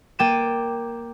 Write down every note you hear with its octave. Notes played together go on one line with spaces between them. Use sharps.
A#3 G5 D6 A6 D#7 E7